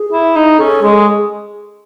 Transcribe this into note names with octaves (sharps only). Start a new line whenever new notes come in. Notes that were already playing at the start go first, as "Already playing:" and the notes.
Already playing: G#4
E4
D#4
C#4 A4
G#3 G#4